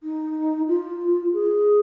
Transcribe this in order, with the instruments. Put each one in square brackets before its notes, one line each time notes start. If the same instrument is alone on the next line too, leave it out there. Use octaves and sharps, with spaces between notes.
[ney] D#4
F4
G#4